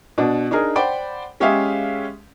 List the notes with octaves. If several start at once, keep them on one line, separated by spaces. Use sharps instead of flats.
B2 D4 F#4
D4 D#4 G#4 A#4
C5 D5 F#5 G5 B5
G#3 C#4 G4 G#4 E5 F5